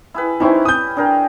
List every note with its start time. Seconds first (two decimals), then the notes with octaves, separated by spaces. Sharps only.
0.14 E4 G#4 B4
0.40 G3 C#4 D#4 E4 C5
0.65 D#6 G6
0.97 D4 G#4 A#4 G5